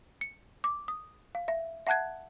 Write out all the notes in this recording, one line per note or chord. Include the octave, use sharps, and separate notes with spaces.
C#7
D6
D#6
F5
E5
E5 F#5 A5 F#6 G#6